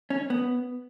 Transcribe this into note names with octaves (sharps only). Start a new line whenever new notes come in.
C#4
B3